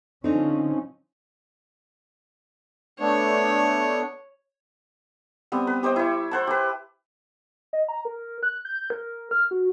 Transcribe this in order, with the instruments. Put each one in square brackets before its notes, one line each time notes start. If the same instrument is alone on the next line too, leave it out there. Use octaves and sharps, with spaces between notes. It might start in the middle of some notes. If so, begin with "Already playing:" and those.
[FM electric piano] D3 [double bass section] F3 C#4 [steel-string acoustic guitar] C4 D#4 C#5
[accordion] A3 B3 D4 [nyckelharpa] C#5
[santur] G3 B3 C4
B4
G4 C5 D#5 G5
E4 C#6
C5 F#5 A5
G4 B4
[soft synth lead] D#5
A#5
A#4
F#6
G6
A#4
F6
F#4